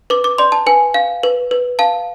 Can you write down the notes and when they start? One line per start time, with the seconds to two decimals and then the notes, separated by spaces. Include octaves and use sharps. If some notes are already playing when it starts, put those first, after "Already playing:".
0.10 B4 D6
0.24 D6
0.38 D5 C6
0.52 A5
0.66 B4 G#5
0.94 F5
1.23 B4
1.51 B4
1.79 F5 A5